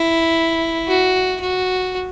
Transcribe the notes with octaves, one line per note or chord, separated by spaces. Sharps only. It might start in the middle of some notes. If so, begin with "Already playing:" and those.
Already playing: E4
F#4
F#4